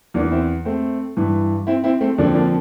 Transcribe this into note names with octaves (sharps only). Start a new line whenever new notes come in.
E2 E3 A#3 D4
C4 E4
A3 C4
G2 E3
C4 E4
C4 E4
A3 C4
F2 D3 F3 A#3 D4
A#3 D4